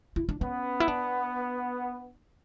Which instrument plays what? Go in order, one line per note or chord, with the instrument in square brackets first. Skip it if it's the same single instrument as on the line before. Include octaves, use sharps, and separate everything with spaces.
[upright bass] E4
D4
[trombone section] B3 [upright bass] C#4
[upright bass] E4
D4